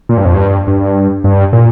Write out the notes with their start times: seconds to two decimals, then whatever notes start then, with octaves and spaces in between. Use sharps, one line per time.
0.09 A#2
0.18 G2
0.25 F2
0.34 G2
0.67 G2
1.24 G2
1.53 A#2